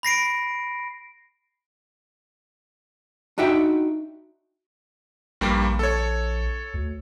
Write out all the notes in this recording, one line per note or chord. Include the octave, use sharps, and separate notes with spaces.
B5 A#6 C7 D7
D4 D#4 F#4 E5 G5
A#1 G2 G3 A#3
A4 C#5
D2